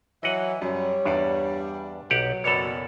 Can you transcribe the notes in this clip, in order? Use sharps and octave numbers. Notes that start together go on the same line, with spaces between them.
E3 F#3 D#5 F#5
F#2 G3 C#5
E2 G2 D4 D5
B1 F#3 G4 F#5
F#1 B2 A4 C#5 D5 B5